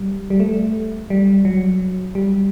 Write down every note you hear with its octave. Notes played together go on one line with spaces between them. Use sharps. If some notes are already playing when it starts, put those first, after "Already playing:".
Already playing: G3
G3
A3
G3
F#3
G3